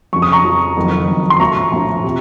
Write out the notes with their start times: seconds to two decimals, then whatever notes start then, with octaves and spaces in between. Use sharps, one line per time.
0.13 F2 C#3 F3 C#6
0.22 D#6
0.32 A#5 C#6
0.44 F2 C#3 F3
0.77 F#1 F2 D#3 F#3
1.08 F#1 F2 D#3 F#3
1.30 C6
1.40 A#1 A2 F3 A#5 C#6
1.72 A#1 A2 F3
2.04 C3